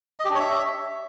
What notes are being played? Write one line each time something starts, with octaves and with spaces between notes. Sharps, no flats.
D#5
G4
D4
C#5
E5